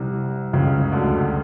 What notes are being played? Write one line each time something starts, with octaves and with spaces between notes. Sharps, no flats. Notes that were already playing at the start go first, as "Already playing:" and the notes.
Already playing: C2 C3
C#2 C#3
D2 D3